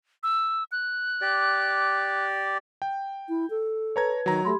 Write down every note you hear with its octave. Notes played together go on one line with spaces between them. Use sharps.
E6
F#6
G4 D5
G5
E4
A4
B4 C#5 A5 A#5 G#6
D#3 F#3 A#5
A3 G4 B5 C6